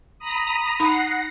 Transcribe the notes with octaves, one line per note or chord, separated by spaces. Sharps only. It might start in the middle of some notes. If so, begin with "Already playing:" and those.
A#5 B5 D#6
D#4 F#5 B5 A#6 C7